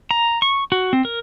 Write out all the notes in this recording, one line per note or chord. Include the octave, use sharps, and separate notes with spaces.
A#5
C#6
F#4
C4
A#4